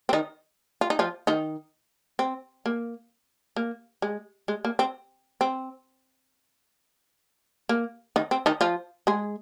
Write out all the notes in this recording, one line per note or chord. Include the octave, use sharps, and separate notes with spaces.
C4
D#3 D#4
F4
D#4
F3 F4
D#3 D#4
C4
A#3
A#3
G#3
G#3
A#3
C4
C4
A#3
D#3 D#4
C4
D#3 D#4
F3 F4
G#3 G#4